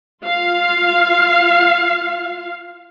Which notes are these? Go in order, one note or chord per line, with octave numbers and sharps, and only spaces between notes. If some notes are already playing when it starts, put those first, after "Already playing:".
F4 F5